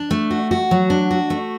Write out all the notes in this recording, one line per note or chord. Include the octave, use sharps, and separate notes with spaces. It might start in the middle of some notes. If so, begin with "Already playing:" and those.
Already playing: D4
A3
F#4
F#4
F#3
D4
F#4
A3